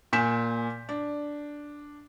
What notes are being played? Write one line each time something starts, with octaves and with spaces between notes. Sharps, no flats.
A#2 G#5 G6 B6 E7
D4